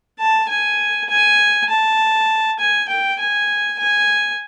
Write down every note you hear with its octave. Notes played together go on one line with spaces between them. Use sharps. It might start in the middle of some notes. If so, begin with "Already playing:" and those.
A5
G#5
G#5
A5
G#5
G5
G#5
G#5